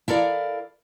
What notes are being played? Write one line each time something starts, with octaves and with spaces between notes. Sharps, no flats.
E4 A4 A#4 D5 F5